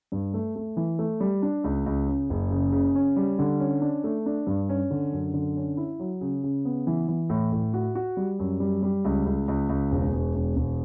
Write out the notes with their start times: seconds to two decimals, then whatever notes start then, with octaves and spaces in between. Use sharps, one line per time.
0.12 G2
0.34 A3
0.56 A3
0.77 E3
0.99 A3
1.20 G3
1.42 D4
1.64 C#2
1.86 C#2
2.07 C#3
2.30 F#1
2.51 C#3
2.72 C#3
2.95 C#4
3.16 G3
3.39 D3
3.60 C#4
3.81 D4
4.04 A3
4.26 D4
4.47 G2
4.69 C#4
4.91 D3
5.13 F#2
5.34 D3
5.57 C#4
5.77 E4
5.99 F#3
6.21 C#3
6.43 C#3
6.65 B3
6.87 E3
7.08 E3
7.30 A2
7.52 A2
7.74 F#4
7.95 F#4
8.17 G3
8.39 F#2
8.60 G3
8.83 G3
9.04 C#2
9.26 C#2
9.48 C#2
9.69 C#2
9.91 E1
10.13 E1
10.35 E1
10.56 E1